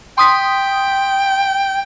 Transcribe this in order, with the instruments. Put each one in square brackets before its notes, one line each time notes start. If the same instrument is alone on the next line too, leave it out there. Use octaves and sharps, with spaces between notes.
[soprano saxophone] G5 [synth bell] C6 D#6 B6